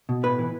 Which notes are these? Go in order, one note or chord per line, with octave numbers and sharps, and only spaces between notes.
B2
A2 B4
E3